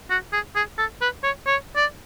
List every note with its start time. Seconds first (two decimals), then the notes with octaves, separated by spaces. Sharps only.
0.10 F#4
0.33 G#4
0.55 G#4
0.78 A4
1.01 B4
1.24 C#5
1.46 C#5
1.76 D5